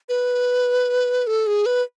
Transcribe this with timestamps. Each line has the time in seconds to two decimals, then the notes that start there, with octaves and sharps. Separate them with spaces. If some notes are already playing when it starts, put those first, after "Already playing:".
0.09 B4
1.27 A4
1.47 G#4
1.66 B4